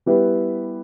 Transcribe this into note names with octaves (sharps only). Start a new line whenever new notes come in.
G3 B3 E4 G4 B4